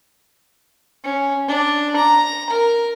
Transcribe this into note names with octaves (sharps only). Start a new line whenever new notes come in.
C#4
D4
A#5
A#4